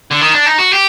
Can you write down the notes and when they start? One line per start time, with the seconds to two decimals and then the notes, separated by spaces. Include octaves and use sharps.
0.11 D3
0.21 D#3
0.33 D4
0.46 D#4
0.58 F#4
0.72 G4